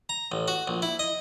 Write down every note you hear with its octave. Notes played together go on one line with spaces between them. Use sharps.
A#5
A1
F#4
A#1
E4
D#5